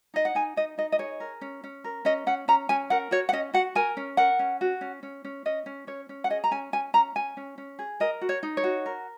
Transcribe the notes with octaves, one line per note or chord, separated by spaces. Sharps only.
D#4 D#5
F#5
D#4 G#5
D#4 D#5
D#4 D#5
D#5
G#4 C#5
A#4
C#4
C#4
A#4
C#4 D#5
C#4 F#5
C#4 A#5
C#4 G#5
A#4 F#5
F#4 C#5
F#5
C#4 D#5
F#4 F#5
A#4 G#5
C#4
A#4 F#5
C#4
F#4
C#4
C#4
C#4
C#4 D#5
C#4
C#4 C#5
C#4
F#5
G#4 D#5
A#5
C#4 G#5
C#4 G#5
C#4 A#5
C#4 G#5
C#4
C#4
G#4
A#4 D#5
F#4
C#5
D#4
C#5
F#4
A#4